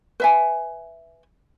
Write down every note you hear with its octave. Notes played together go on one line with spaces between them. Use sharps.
B4 E5 G#5